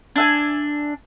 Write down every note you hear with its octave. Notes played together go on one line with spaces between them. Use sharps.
D4 E5 G#5